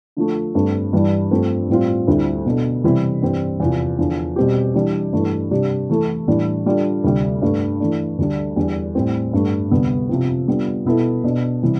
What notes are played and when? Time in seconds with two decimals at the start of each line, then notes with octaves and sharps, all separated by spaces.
0.17 D3 F3 A3
0.55 G2 D3 A3 C4
0.93 G2 E3 G3 D4
1.31 G2 F3 A3 C4
1.69 A2 G3 C4 F4
2.08 D2 D3 G3 C4 E4
2.46 B2 B3 D4 A4
2.84 C3 E3 G3 C4 E4
3.22 G2 E3 G3 C4
3.60 E2 C3 F3
3.99 E2 D3 F3
4.36 B2 G3 C4 G4
4.75 E3 G3 D4 G4
5.13 G2 E3 A3 D4
5.51 C3 G3 D4 G4
5.89 E3 A3 E4 A4
6.28 A2 E3 G3 D4
6.66 D3 G3 D4 F4 A4
7.04 D2 C3 G3
7.42 G2 D3 A3
7.80 E3 A3 D4
8.18 D2 D3 G3 D4
8.56 E2 D3 G3
8.95 A2 G3 C4
9.33 G2 D3 A3
9.71 D2 C3 G3 B3
10.09 C3 F3 C4
10.47 D3 G3 B3 F4
10.85 B2 B3 E4 A4
11.24 B2 B3 D4
11.63 C3 E3 G3